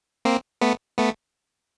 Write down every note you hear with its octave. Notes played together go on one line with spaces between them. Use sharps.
A#3 C4
A3 B3
A3 B3